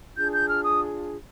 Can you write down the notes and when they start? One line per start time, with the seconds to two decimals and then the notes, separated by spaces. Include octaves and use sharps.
0.16 D4 F4 G#4 G6
0.32 G6
0.48 F6
0.63 D#6